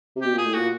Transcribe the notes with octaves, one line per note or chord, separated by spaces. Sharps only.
C3
B2 G4
A#2 G#4
A2
A#2 F#4